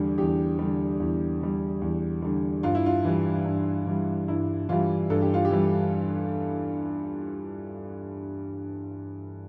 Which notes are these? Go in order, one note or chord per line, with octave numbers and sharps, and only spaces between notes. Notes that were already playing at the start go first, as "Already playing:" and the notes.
Already playing: E2 D3 G3
E2 G4
D3 G3
E2
D3 G3
E2
D3 G3
G2 F4
E4
F4
E3 G3
G2
E3 G3
G2 E4
E3 G3 F4
G2 A4
G4
F4
G4
E3 G3